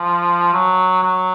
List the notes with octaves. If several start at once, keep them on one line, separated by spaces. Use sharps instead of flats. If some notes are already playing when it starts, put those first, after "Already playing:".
Already playing: F3
F#3
F#3